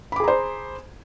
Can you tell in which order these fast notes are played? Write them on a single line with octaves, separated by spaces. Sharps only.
B5 D6 G#4 A#5 C5